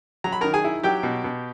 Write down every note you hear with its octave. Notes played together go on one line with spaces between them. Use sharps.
F#3 A#5
B5
D#3 A#4 A#5
G#4 G#5
E4
F#3 G4 G5
B2
B2